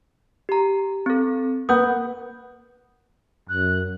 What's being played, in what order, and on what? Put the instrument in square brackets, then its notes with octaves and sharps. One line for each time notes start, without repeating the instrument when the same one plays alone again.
[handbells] G4 A#5
C4 A4
[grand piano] A#3 B4 F#5 [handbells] D#6 G6
[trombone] F#2 [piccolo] F#6